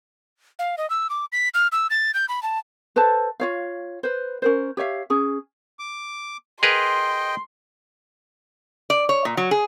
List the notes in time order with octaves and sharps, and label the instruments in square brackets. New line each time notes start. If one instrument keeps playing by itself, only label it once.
[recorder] F5
D#5
E6
D6
B6
F6
E6
A6
G6
B5
A5
[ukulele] A4 B4 C5 A5
F4 C#5 F5
B4 C5
C#4 A#4 C5
G4 C#5 E5 F5
C#4 G#4
[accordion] D6
[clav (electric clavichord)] G#4 A#4 B4 [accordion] D#5 G5 [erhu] C6
[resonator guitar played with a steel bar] D5
C#5
A#2
F#3
G#4